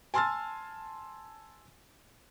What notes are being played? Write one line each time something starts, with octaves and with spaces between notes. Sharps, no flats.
G#5 A5 C6 E6 F6 A6